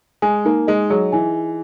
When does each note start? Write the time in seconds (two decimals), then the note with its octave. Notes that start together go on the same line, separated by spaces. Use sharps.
0.22 G#3 G#5
0.45 A#3 D#4
0.67 G#3 D#5
0.90 F#3 G#4
1.12 E3 G#5